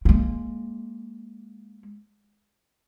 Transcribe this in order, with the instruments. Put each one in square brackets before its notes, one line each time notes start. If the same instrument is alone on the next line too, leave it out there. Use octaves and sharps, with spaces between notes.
[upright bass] G#3 A#3